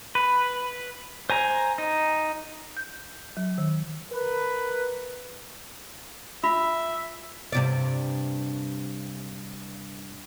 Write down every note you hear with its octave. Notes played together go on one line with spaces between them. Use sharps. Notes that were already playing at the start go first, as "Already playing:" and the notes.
B4
C5 G#5 A#5
D#4
G6
F#3
D#3
A#4 B4
F4 E5 F5 B5
G2 C3 D5